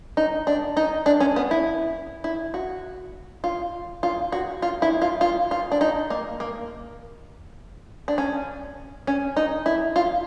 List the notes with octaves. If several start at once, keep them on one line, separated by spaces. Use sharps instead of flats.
D#4
D4
D#4
D4
C#4
B3
E4
E4
F#4
F4
F4
F#4
F4
E4
F4
F4
F4
D4
D#4
A#3
A#3
D4
C#4
C#4
D#4
E4
F4